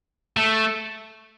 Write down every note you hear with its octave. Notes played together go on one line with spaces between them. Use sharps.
A3